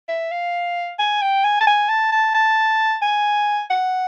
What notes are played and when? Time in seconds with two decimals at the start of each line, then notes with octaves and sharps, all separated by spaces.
0.08 E5
0.31 F5
0.99 G#5
1.22 G5
1.44 G#5
1.61 A5
1.67 G#5
1.89 A5
2.12 A5
2.35 A5
3.02 G#5
3.70 F#5